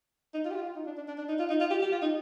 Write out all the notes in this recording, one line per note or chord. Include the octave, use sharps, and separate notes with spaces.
D#4
F4
G4
F4
F4
D#4
D4
D4
D4
D4
D#4
F4
D#4
F4
G4
G4
F4
D#4